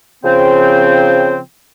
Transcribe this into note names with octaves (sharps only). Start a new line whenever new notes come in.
C#3 F3 C4 G5